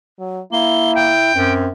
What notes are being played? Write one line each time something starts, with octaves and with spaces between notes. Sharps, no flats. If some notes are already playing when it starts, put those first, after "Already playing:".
F#3
A#3 E4 G7
G5
F#2 C4